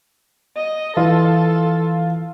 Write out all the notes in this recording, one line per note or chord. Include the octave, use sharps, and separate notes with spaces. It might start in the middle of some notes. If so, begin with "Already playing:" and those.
D#5
E3 F4 A4